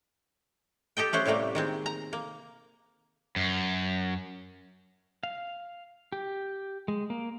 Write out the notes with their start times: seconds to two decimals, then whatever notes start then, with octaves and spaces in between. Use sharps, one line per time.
0.97 G4 A4 D#5 G5
1.13 A3 C#4 C5 F#5
1.25 A2 C3 G3 A3 A#3
1.55 D#3 G#3 C4
1.86 A#5
2.13 A#3
3.36 F#2
5.23 F5
6.12 G4
6.88 G#3
7.10 A#3